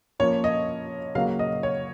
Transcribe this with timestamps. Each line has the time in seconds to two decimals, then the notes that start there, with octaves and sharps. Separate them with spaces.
0.19 F3 A#3 C#4 F4 C#5
0.44 D#5
1.15 C#3 F#3 A#3 F5
1.39 D#5
1.63 C#5